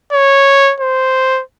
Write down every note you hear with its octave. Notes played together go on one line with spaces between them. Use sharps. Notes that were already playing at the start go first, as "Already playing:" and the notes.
C#5
C5